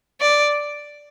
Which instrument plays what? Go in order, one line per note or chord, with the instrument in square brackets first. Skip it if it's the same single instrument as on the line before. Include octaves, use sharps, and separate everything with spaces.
[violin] D5